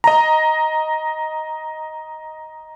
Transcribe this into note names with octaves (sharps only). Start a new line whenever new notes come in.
D#5 A#5